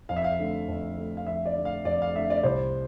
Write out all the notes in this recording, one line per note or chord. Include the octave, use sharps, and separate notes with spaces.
F2 F5
E5
F5
D3 A3
F2
D3 A3
F5
F2 E5
D5
D3 A3
F5
F2 D5
F5
D3 A3 E5
D5
C2 C5